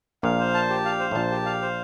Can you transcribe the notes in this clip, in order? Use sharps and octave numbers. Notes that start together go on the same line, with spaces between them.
A#1 A#2 F5
C5
A5
G4
F5
C5
A2
A#1 A#2 A5
G4
F5
C5